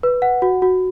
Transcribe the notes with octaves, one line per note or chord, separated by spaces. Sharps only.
B4
F#5
F#4
F#4